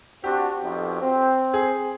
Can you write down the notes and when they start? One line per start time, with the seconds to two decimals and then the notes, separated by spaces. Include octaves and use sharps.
0.24 C4 D4 F#4 G4
0.62 B1 F2
1.01 C4
1.54 G#4